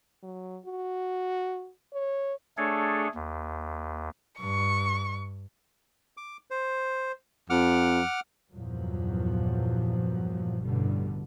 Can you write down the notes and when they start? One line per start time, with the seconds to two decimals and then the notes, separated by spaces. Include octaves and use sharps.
0.23 F#3
0.66 F#4
1.94 C#5
2.57 A3 D4 G#4 A4 C#5
3.15 D#2
4.40 G2 C#6
6.17 D6
6.50 C5
7.50 F2 F#5 D6 F6
8.55 E2 G2 A#2 F3 F#3
10.63 A1 G2 B2 D3 G3